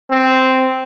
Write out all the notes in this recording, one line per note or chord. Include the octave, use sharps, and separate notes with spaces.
C4